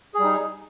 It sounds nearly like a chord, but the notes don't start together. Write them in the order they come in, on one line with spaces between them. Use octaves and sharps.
G#4 G3 D#4